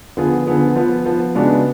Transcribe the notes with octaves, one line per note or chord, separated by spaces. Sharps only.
D3 F3 B3 F4 G#4
D3 F3 B3 F4 G#4
F3 B3 F4
F3 B3 F4
C#3 G#3 B3 D4 F#4